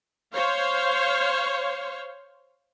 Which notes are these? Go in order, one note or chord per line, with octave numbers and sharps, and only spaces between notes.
C5 C#5 F5